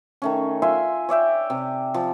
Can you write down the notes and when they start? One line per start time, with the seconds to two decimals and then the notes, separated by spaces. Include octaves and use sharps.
0.22 D#3 A3 C#4
0.62 F4 E5 G#5 C6
1.09 C#5 D5 E5 G5
1.50 C3
1.94 F3